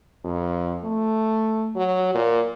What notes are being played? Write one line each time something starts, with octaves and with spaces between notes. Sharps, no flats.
F2
A3
F#3
A#2